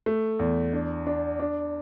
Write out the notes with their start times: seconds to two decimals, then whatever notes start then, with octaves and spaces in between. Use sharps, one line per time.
0.06 A3
0.39 E2
0.73 D4
1.07 D4
1.40 D4